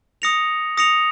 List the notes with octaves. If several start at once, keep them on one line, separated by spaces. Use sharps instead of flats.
D#6 A#6 C#7 F7
D#6 A#6 C#7 F7